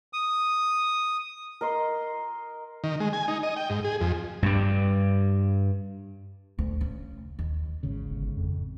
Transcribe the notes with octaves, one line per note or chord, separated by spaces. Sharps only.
D#6
A#4 D#5 C6
D#3
G#3
G#5
D#4
D#5
G5
G#2
G#4
F2
G2 G3
D2
C#3
D#2
G#1 C#3
G1
F2